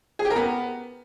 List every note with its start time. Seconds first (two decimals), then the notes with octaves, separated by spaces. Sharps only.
0.19 G#4
0.25 G4
0.30 A#4
0.36 B3